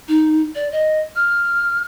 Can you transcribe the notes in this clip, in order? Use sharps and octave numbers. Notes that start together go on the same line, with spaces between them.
D#4
D5
D#5
F6